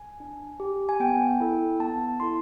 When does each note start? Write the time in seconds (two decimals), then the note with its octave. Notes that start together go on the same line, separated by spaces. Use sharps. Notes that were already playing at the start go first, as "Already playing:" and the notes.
Already playing: G#5
0.20 D4
0.60 G4
0.89 G#5
1.00 B3 G5
1.40 E4 A4
1.79 B3 A5
2.20 E4 A4 C6